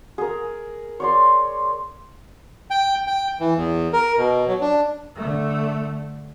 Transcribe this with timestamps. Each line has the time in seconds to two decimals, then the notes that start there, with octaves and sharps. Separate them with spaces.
0.18 G#4 A#4
1.00 C#5 D5 C6
2.70 G5
3.07 G5
3.40 E3
3.57 E2
3.93 A#4
4.17 B2
4.48 F#3
4.61 D4
5.15 D3 A3